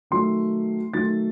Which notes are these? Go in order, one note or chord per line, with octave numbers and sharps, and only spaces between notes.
D#3 F#3 A3 C6
D#3 F#3 A3 A6